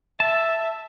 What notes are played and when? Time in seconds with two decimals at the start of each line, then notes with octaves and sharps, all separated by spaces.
0.20 E5 A5